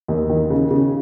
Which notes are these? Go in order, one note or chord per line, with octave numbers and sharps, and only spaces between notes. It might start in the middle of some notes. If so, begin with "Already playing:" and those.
D#2
D#3
C#3
C#3